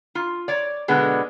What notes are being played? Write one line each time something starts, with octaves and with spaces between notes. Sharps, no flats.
F4
C#5 D5
B2 D3 G#3 B3